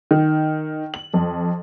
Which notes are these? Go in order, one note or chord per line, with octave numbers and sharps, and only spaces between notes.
D#3
F#7
F2